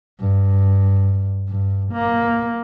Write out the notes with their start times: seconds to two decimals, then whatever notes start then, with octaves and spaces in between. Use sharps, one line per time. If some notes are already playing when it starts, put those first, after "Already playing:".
0.20 G2
1.49 G2
1.92 A#3